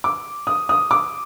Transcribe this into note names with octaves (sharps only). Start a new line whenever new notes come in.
D6
D#6
D#6
D6